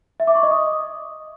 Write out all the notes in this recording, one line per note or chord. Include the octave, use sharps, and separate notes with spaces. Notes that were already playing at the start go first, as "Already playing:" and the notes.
E5
D6
C#6
D#5
D#6